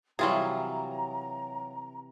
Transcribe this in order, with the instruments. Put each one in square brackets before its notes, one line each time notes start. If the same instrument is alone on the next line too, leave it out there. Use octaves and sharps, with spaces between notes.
[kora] C3 E3 G3 [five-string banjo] F#3 F4 G#4 [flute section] A#5